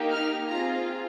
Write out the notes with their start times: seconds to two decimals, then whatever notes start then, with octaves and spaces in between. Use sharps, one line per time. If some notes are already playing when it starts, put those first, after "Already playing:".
Already playing: A#3 D#4 G4
0.11 F6
0.48 C4 F4 G#4 A#5